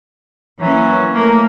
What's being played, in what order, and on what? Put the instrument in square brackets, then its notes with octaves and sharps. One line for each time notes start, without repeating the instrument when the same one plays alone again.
[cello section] E3 A#3 C#4 [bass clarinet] F#3
[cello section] A3 A#4 [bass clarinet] A#3